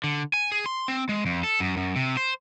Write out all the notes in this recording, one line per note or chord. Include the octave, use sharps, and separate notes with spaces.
D3
G#5
G#4
C6
C4
G#3
F2
A4
F#2
F#2
C3
C5